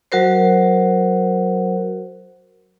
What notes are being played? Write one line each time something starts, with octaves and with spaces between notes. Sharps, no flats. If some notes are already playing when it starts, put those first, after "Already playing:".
F#3 F#4 A#4 C5